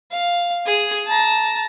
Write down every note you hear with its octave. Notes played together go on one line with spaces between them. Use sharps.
F5
G#4
A5 A#5